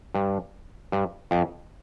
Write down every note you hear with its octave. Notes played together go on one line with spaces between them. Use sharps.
G2
G2
F2